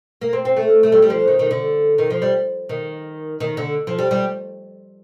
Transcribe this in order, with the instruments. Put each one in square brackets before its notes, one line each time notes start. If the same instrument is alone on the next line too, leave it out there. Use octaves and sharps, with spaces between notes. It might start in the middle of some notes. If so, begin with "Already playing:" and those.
[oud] A#3
C4
C4
A3
A3
G3
G3
F3
D#3
D#3
D3
D#3
F3
G3
D#3
D#3
D3
F3
G3
G3